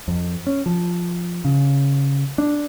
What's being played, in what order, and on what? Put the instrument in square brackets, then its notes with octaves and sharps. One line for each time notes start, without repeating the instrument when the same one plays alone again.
[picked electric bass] F2
C#4
F3
C#3
D4